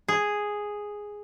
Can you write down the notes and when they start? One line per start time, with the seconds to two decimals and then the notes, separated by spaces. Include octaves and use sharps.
0.08 G#4